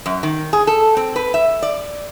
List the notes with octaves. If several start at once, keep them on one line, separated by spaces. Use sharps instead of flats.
F#2
D#3
G#4
A4
C4
B4
E5
D5